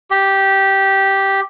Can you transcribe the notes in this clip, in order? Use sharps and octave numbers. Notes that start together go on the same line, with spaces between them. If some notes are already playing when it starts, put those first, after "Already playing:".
G4